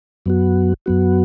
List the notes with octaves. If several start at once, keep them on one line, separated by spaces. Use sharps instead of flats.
F#2 F#3 B3 F#4
F#2 F#3 B3 F#4